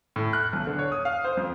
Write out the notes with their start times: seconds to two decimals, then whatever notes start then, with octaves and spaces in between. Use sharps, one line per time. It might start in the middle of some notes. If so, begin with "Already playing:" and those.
0.16 A2
0.33 F#6
0.53 B1
0.67 D3
0.79 C#5
0.92 D#6
1.05 F5
1.25 C5
1.37 F2